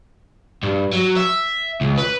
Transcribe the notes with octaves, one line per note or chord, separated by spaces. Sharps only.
G2
F#3
E5
C#2
B4